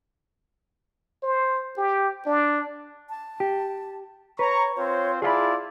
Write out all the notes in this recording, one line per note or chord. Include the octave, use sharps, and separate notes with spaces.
C5
G4
D4
A5
G4
B4 C#5 A#5 C#6
C4 F4 C5 C#5
E4 F4 G#4 D5 F5 A5 B5